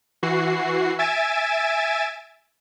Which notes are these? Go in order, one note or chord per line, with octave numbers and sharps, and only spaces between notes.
E3 F#4 C7
E5 G#5 A6 D7 E7